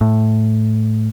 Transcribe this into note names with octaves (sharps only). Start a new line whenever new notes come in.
A2